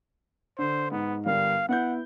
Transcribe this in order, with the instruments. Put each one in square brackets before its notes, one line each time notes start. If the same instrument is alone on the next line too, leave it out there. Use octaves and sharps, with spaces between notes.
[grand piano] D3 [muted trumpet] C5
[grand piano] G#2 [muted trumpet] B3
[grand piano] G1 G3 A#4 [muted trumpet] F5
[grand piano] B3 E4 G6 [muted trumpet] F#5